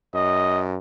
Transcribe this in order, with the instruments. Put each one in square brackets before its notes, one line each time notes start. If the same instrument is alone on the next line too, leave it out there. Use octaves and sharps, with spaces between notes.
[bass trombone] F#2 [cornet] D#5